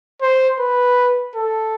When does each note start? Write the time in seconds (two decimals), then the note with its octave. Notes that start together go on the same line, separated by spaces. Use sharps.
0.22 C5
0.60 B4
1.36 A4